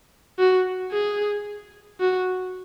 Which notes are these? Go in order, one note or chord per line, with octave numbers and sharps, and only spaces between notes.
F#4
G#4
F#4